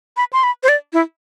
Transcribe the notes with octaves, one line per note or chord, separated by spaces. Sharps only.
B5
C6
B5
C5
D5
E4